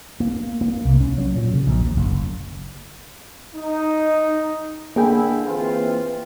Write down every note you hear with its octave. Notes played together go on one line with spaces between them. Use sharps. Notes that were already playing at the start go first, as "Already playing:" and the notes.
A#3
A#3
C2
C#4
F#3
A#2
C#3
A#1
D#2
F#1
D#4
D3 A#3 E4 G#4 G5
E3 C4 F4